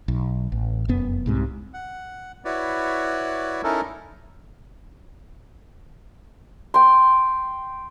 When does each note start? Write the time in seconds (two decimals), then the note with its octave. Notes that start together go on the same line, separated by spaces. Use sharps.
0.08 B1
0.52 A1
0.88 F1 F#2 B3
1.26 C2 G#2 C3
1.74 F#5
2.45 E4 F#4 B4 C#5 D5
3.64 C#4 D#4 E4 A4 A#4
6.74 G5 C6